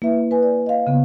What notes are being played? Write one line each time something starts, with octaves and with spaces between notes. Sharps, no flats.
A#3 E4 B4 E5
B4 G#5
D5
D#5 F5
C#3 B3